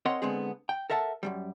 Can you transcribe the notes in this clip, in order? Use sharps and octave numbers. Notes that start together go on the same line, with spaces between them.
C4 A#4 C#5 D#5 F#5 C6
D3 G#3 B3 C4 G#4
G5
A4 A#4 E5 F#5 A5
F#2 A#2 G3